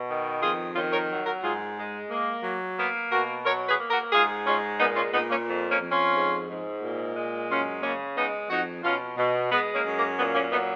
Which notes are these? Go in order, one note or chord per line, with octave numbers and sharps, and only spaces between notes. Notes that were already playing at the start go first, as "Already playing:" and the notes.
Already playing: B2
D#3
F2 F4 G#4
D#3 C#4 F4
A#4 C#5
F#3
F#4 A#4
G#2 F4 G#4
G#3
A#3
F#3
A#3 B3
B2 F#4 A#4
F#3 A#4 C#5
G#4 B4
A#3
F#4 A#4
G#2 F4 G#4
G#3 C#4 F4
A#2 B3 D#4
C#4 F4
A#2 B3 D#4
A#3 C#4
F2
A#3 C#4
F2
C#4 F4
G#2
G#2
A#2
G#3
F#2 C#4 F4
C#3 A#3 C#4
G#3 B3 D#4
F2 D#4 F#4
B2 C#4 F4
B2
G#3 B3
A#3 C#4
F#2
A#3
A#2 B3
A#3 C#4
F#3 B3 D#4